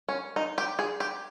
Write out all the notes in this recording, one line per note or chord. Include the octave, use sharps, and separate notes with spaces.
C#4
D#4
G4
G#4
G4